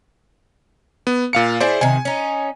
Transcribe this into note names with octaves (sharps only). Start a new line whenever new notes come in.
B3
A#2 F5 C#7
E4 G#4 C5 D5 E5
C3 D#3 G#5
C#4 D#4